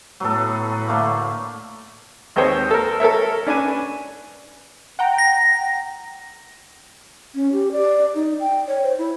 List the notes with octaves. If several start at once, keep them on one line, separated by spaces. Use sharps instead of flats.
A2 F#3 B3 A4
D3 A3 A#3
D#2 G#3 C4 D#4 C5 C#5
A4 A#4
A4 A#4 C#5 E5
C#4 D4 B4 G#5
F#5 G5 A#5
A#6
C#4
G4
D5
D#4
G5
C#5
C5
E4